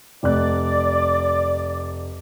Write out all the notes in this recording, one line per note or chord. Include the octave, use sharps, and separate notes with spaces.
F1 D5 D6 F#6